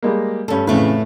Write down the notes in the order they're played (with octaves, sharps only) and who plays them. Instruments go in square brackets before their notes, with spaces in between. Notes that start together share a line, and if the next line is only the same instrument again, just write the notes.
[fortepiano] G3 G#3 A#3
[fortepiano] G2 A3 [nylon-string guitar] C#4 A4
[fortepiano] F2 C#3 E3 [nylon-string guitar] A2 A3 B4